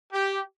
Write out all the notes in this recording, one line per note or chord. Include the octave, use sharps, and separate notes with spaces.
G4